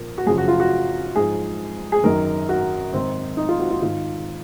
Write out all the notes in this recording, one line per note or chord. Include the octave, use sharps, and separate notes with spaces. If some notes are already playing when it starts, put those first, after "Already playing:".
Already playing: A#2 F3 A#4
F#4
F#2 C#3 F3 G#4
F#4
F4
F#4
G#2 F3 G#4
G#4
F#2 D#3 A#4
F#4
G#2 D#3 C4
D#4
F4
F#4
F4
G#2 D#3 F4